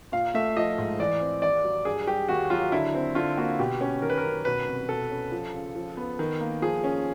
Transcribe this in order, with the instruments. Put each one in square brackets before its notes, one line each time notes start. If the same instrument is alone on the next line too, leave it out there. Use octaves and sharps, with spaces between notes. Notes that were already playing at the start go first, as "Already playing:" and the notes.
[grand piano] A#2 [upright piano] F5
[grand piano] A3 [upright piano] E5
[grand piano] F3 [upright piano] D#5
[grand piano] G#2
[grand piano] E3 [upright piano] D5
[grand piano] C4
[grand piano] D#2 [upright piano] D5
[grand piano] F#3
[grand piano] G2 [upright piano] G#4
[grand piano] G3 [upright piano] G4
[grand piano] D#2 [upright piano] F#4
[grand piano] F#3 [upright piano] F4
[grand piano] D3 [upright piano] E4
[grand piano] C4
[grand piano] D3 [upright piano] F4
[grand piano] A#3 [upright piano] F#4
[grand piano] B2 [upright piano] G4
[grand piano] C#4
[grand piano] D#3 [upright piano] A#4
[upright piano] B4
A#4
[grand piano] F#2
[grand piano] B2 [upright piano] B4
[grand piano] C2
[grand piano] B2 [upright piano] A4
[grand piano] C#4
F3
C#3
F3
B3
D#3
A#3
[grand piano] F3 [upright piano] G#4
[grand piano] C#4